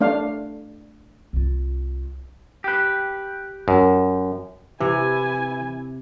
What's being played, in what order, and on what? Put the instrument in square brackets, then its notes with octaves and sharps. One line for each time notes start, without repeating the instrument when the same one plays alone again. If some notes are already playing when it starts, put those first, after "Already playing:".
[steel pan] A3 D4 F5
[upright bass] C2 F4
[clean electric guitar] G4 B4
[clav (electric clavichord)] F#2
[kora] C3 [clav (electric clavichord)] E3 [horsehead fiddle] E4 G#5